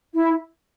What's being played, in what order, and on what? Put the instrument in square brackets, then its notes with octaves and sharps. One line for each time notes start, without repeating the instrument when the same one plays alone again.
[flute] E4